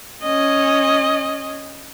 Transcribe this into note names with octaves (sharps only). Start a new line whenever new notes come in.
C#4 D#5